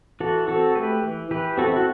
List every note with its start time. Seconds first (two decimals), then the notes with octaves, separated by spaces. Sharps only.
0.20 E3 F#4 A4
0.48 C4 F#4 A4
0.75 A3 G4 B4
1.03 E3
1.31 E3 G4 B4
1.57 C4 F#4 A4
1.68 E4
1.76 F#4